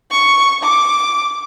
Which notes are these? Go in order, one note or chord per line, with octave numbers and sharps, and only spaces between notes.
C#6
D6